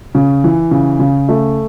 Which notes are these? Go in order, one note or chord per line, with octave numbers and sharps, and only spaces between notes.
C#3
E3
C#3
C#3
A3